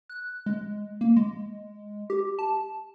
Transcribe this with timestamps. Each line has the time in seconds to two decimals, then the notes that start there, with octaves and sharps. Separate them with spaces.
0.09 F#6
0.46 G#3
1.01 A#3
1.16 G#3
2.10 G4
2.39 A5